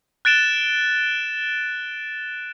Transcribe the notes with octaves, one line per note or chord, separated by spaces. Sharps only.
F#6 A6 D7 E7 G7